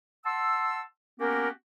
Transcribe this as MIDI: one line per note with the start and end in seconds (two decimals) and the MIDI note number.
0.25 0.82 78
0.25 0.82 81
0.25 0.82 84
0.25 0.82 88
1.20 1.48 58
1.20 1.48 59
1.20 1.48 61
1.20 1.48 66
1.20 1.48 67
1.20 1.48 70